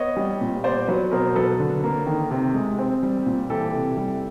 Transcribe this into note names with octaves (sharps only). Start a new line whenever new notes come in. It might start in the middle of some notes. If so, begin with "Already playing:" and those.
Already playing: B3 C#5 D#5
G3
A#2
B3 C5 D5
F#3 B4 C#5
B2 A#4 C5
F#3 A4 B4
D3
A#3
D#3
C3
G#3
C4
G3
A#2
E3 G4 A4
C3
G3